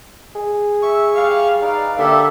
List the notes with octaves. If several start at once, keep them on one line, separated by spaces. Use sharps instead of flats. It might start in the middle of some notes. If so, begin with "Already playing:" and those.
G#4
E5 C#6
G3 F5
D#4 B4 D5 F5
D3 A#3 G4 A4 E5